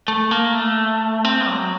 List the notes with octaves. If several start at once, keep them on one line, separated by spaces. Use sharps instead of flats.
A3
A#3
A3
C4
F#3